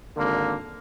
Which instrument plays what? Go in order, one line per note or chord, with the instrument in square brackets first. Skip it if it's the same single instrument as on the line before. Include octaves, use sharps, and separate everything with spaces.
[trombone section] G#1 D3 A#3